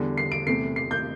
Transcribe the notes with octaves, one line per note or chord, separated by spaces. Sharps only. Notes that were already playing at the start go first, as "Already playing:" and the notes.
Already playing: E2 D3 G3
C7
D7
E2 C3 A3 C7
C7
G6